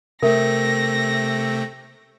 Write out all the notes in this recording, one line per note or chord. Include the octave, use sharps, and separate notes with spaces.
C3 A3 C4 A#4 E5 A#6